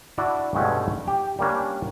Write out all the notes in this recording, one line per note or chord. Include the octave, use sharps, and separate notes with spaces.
D4 E4 F#4 D5
G2 B2 G#3 A3 C#4
G4
G3 A#3 C#4 D4